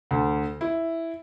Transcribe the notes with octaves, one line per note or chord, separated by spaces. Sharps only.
D2
E4